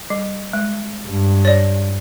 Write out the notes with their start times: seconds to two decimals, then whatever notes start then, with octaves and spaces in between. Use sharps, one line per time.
0.10 G3
0.53 G#3
1.06 G2
1.45 C#5 D5